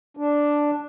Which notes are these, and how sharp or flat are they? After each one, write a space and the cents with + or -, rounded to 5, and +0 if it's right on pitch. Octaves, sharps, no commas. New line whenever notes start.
D4 +0